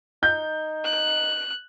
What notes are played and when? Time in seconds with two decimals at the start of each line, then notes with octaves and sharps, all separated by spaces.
0.23 D#4 G6
0.85 F#6